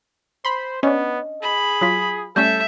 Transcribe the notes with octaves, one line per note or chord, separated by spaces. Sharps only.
C5 B5 C6
B3 C#4 D4 D#5
G#4 B5
F#3 F4 D#6 B6
G3 A3 C#4 A4 E5 G6